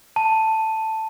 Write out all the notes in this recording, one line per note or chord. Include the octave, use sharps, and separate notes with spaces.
A5